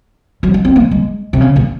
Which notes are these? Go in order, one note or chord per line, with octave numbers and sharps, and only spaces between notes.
F#3
G#3
C4
A#3
G#3
C3
C#3
A#2